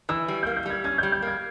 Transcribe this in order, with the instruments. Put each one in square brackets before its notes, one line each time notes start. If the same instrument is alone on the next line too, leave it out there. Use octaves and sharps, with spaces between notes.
[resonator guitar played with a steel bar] E3 [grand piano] E6
[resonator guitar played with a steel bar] G3
[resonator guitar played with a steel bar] A#3 [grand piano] G6
[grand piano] G6
[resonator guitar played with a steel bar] G3 [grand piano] G#6
[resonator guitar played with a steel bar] C#4 [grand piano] G#6
[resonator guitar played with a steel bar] G3 [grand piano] G6
[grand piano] G6
[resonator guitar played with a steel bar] A#3 [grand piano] G#6